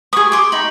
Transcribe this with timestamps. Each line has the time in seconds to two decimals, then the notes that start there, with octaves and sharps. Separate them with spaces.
0.13 B4 C#6 D#6
0.17 G#4
0.32 C6 D6
0.52 D#4 B5 C#6